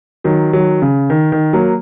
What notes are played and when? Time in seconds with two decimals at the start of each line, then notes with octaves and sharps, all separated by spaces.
0.24 D#3 F#3
0.53 D#3 F#3
0.82 C#3
1.10 D#3
1.32 D#3
1.53 F#3 A#3